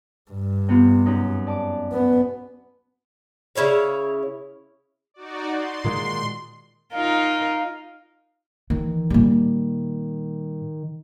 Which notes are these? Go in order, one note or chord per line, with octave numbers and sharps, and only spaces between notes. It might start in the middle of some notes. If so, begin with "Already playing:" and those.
G2
C3 B3 F4
F#2 D#4
D5 A5 D6
B3
C#3 E4 C#5 F5
D#4 F#4 D5
C6
A#2 D#3 G#3
D#4 F4 A#4 F5
D#3 E3
A#2 G3